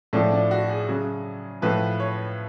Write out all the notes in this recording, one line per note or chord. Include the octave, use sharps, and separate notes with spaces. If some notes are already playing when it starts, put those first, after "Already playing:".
A2 F3 D4
D4
F#4
G#4
C#3 F#3
A2 F3 B4
C#5